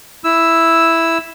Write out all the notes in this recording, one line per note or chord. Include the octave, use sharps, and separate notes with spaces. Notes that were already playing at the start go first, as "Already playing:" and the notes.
E4 E6